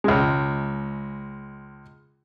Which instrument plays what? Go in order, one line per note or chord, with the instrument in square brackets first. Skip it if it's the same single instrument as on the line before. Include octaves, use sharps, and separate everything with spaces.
[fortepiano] C#2 G#3